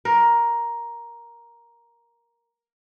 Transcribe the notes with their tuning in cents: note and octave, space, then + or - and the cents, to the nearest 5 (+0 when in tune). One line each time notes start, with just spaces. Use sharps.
A#4 +10